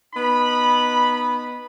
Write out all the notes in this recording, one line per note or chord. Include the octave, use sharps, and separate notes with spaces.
B3 D#4 B5